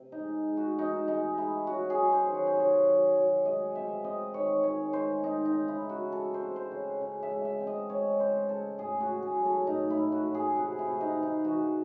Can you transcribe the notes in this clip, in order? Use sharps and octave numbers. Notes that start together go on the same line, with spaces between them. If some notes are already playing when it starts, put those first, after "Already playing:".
Already playing: C3
D#4
G#3
G#3
F#4
E3 D#4
G#3 D#4
G#3 E4
C#4 F#4
G#4
F#3
C5
D#3
C#5
C5
C3 C#5
F#3
F#3
G#3 D#5
C4 E5
C4 D#5
D#3 C#5
G#3 C#5
G#3 C5
C4 D#4
D#4
C#3
E4
C#3
F#4
G#3 A4
C5
C4
C5
C#3
C#3
E5
G#3
E5
C4
D#5
G#3 C#5
C#3 C5
C#3 A4
A2 G#4
F#4
A2
G#4
F#3
A4
A2 D#4
E4
A2
F#4
A2
G#4
C3 F#4
E4
C3
D#4
E3
D#4
E3 F#4